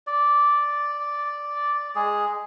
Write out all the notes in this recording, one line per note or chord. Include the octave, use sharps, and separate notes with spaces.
D5
G#3 G#4